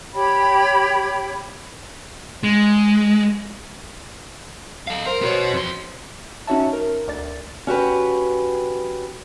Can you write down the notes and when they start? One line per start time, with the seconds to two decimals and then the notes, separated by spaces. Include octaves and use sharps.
0.13 G4 C#5 G5 B5
2.43 G#3
4.87 A4 F5
5.06 A#4 C5
5.21 B2 B3 F#4 A4 C#5
5.54 F2 C6
6.47 C#4 D#4 F#4 C#5 E5 A5
6.73 A#4
7.08 D2 D5 A6
7.67 C#4 F#4 G4 B4